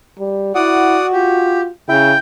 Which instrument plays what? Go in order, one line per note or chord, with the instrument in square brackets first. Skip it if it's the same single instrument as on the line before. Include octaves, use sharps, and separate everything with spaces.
[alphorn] G3
[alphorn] E4 [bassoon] F#4 [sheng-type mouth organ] D5 F#5 D#6
[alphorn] F4 [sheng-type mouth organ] G4
[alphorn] C#3 [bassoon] E4 [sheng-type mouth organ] G5